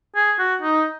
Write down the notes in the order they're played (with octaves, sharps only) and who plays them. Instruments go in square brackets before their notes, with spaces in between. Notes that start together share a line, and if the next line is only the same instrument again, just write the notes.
[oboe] G#4
F#4
D#4